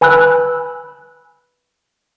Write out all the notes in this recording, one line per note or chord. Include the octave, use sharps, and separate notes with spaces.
B4 G#5 B5 E6 F#6